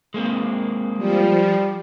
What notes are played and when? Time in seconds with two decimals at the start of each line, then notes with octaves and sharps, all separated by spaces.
0.14 G#3 A#3 C4
0.99 F3 G3